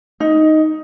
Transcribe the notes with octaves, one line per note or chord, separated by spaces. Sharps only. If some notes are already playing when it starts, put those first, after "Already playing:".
D#4